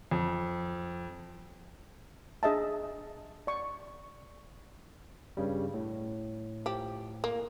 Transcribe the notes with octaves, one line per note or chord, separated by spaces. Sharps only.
F2
D4 G#4 D#5 E5 A5
D5 C#6
G2 C#3 G3
A2
F3 G4
A#3